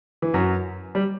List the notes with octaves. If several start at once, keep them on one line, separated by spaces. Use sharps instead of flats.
E3
F#2 F#3
G3